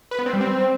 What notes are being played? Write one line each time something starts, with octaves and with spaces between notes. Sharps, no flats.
B4
B3
C4
G3
C4